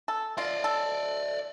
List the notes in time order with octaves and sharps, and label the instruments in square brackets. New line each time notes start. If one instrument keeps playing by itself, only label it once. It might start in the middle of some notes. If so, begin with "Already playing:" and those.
[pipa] A4
[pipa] F4 [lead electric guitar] D5 D#5
[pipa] A4